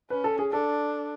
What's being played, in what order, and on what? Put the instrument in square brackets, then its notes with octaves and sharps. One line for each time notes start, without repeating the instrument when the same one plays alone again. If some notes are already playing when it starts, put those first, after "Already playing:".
[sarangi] C#4 [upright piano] B4
[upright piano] A4
G#4
[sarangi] D4 [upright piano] A4